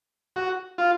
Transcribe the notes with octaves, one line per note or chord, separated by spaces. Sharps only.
F#4
F4